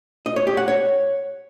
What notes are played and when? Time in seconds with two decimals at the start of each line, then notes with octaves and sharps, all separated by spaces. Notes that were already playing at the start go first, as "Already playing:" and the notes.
0.26 D#5
0.36 C#5
0.47 G4
0.57 F#5
0.68 C#5